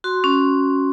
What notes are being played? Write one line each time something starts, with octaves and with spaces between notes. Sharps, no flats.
F#4 C6
C#4